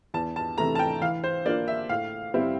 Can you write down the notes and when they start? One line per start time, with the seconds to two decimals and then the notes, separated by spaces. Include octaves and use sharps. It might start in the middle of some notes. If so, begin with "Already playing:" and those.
0.14 E2 A5
0.36 A5
0.58 C3 E3 A3 A#5
0.75 A5
0.79 G5
1.01 E3 F5
1.24 C5
1.46 A#3 D4 F4 D5
1.68 E5
1.89 A2 F5
2.34 G3 C4 E4